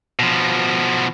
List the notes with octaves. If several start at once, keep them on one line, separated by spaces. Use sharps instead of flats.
B2 F3